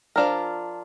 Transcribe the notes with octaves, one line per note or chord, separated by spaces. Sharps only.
F3 D4 F4 A#4